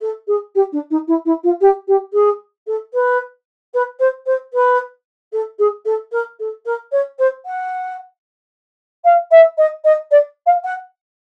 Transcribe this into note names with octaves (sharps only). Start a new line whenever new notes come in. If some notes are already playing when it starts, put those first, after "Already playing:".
A4
G#4
G4
D4
D#4
E4
E4
F4
G4
G4
G#4
A4
B4
B4
C5
C5
B4
A4
G#4
A4
A#4
A4
A#4
C#5
C5
F#5
F5
E5
D#5
D#5
D5
F5
F#5